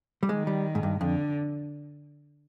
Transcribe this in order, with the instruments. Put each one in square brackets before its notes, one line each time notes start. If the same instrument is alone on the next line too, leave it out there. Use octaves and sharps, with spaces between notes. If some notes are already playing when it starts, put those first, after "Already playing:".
[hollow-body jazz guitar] G3
[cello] D#3 [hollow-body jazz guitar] G#3
[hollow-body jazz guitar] G3
G#2
G2
[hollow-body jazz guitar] F2 [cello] D3